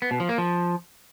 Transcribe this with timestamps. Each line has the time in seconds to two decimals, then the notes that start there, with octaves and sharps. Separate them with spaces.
0.02 B3
0.11 B2
0.20 F3
0.29 A#3
0.38 F3